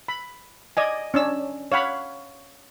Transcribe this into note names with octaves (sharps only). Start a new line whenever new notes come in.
B5
D5 D#5 G#5
C#4 D4 E6
C#5 F5 F#5 B5